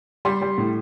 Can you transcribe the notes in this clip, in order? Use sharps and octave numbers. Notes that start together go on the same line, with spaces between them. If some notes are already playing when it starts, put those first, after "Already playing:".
G3 C6
G3
A2